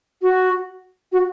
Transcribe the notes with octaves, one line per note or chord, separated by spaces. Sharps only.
F#4
F#4